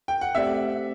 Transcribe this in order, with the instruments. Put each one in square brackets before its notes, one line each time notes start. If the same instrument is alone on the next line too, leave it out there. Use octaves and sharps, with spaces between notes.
[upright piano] G5
F#5
[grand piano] A3 C4 G4 D5 [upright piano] E5